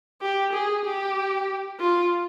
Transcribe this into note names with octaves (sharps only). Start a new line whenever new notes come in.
G4
G#4
G4
F4